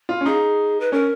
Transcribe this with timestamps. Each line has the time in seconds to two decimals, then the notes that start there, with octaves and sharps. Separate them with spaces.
0.09 F4
0.21 C#4
0.26 D#4 G#4
0.80 B4
0.92 C#4 A#4